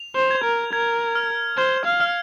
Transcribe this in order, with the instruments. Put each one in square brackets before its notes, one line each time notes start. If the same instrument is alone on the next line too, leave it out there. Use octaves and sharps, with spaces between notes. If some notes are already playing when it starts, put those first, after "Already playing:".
Already playing: [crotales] F7
[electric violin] C5
[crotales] G#6
[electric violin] A#4
[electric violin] A#4 [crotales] G#6
[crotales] F6
[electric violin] C5 [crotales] G#6
[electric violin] F5
[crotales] F6